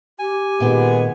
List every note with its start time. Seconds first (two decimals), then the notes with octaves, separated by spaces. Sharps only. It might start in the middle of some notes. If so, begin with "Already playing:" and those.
0.19 G4 G#5
0.60 A#2 D#3 G#3 B3 G5